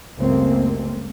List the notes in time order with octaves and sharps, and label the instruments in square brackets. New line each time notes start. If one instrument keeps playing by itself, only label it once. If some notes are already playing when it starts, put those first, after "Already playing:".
[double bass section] C#2 F#2 G3 A3 A#3 C4